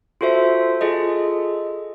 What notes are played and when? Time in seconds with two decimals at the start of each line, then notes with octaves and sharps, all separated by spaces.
0.21 F4 F#4 A4 C5 E5
0.81 F4 G#4 A4 D#5